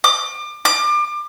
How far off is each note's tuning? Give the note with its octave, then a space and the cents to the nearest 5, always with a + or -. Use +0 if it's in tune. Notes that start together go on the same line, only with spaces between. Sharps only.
D6 +30
D6 +30